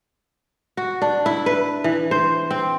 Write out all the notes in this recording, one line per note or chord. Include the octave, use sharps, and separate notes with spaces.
F#4
D4
E4
B4
E3
C5
C4